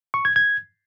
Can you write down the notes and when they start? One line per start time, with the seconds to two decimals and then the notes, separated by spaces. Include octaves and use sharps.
0.14 C#6
0.25 G#6
0.36 G#6